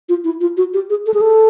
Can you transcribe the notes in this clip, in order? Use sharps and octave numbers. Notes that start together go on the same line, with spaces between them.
F4
E4
F4
F#4
G4
G#4
A4
G#4
A4